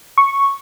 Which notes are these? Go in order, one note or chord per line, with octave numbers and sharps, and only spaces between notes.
C#6